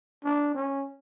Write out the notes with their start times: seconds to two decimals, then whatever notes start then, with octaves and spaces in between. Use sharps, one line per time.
0.24 D4
0.55 C#4